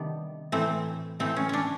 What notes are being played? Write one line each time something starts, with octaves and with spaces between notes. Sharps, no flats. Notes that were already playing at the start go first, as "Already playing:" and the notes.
Already playing: C3 D#3 G3 B3 D4
A2 E3 A3 C4
A2 E3 A3 C4
C#4
C#4 D4